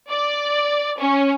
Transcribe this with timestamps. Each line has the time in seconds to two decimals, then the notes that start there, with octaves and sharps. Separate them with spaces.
0.10 D5
1.00 C#4